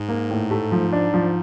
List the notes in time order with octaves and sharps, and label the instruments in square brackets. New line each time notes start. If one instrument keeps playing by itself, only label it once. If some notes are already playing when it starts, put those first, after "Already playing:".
Already playing: [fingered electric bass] G#2
[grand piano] A#3
A2
A3
F3
D4
F3